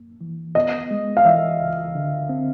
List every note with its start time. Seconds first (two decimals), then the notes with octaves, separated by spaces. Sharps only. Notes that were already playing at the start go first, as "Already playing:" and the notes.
Already playing: F#2 A#3
0.21 E3
0.55 B3 D#5
0.91 G#3
1.17 F5
1.25 E3 E5
1.60 C#2
1.95 D3
2.29 C4